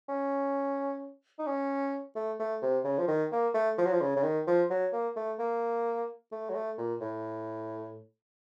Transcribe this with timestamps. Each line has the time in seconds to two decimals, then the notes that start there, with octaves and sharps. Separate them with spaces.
0.09 C#4
1.39 D#4
1.47 C#4
2.16 A3
2.40 A3
2.62 C3
2.85 C#3
2.98 F3
3.08 D#3
3.32 A#3
3.54 A3
3.78 F3
3.86 F#3
3.93 F3
4.01 C#3
4.17 C#3
4.23 D#3
4.47 F3
4.70 F#3
4.93 A#3
5.16 A3
5.39 A#3
6.32 A3
6.50 F#3
6.55 A3
6.78 A#2
7.01 A2